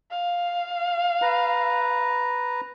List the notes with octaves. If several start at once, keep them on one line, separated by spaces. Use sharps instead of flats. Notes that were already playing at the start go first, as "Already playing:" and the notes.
F5
B4 A#5